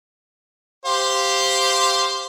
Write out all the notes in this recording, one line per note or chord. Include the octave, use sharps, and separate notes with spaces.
G4 C5 F5